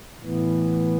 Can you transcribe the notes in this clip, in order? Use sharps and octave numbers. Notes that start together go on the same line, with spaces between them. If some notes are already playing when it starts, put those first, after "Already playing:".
A2 E3 B3